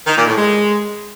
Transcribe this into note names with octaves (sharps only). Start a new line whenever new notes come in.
D#3
A#2
A2
G#3